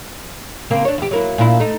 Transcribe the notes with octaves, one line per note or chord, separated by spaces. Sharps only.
C#3 A#3 C4
D4 C#5
E2 G4
F#3 A#3 E4
A#2 D4 E4
A3 D#4